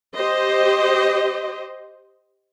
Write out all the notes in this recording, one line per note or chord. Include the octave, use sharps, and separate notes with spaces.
G4 C5 D#5